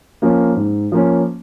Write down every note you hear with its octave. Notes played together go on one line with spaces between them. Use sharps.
F3 A#3 C#4
G#2
F3 A#3 C#4